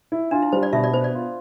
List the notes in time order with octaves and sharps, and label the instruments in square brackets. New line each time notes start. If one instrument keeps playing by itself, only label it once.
[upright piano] E4
[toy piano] D4 [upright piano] F4
[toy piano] E4
[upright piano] G3 [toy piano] C5
[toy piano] D5
[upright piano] B2 [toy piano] E5
[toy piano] D5
[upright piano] B3 [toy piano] C5
[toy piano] D5
[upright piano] F4